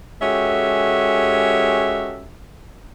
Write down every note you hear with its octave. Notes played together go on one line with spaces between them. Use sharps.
G#3 C#4 F#4 G4 A4 E5